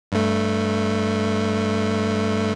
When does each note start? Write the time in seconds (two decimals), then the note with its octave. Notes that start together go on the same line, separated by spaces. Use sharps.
0.12 G2 A3